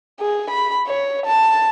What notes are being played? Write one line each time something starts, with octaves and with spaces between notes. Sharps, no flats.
G#4
B5
C#5
A5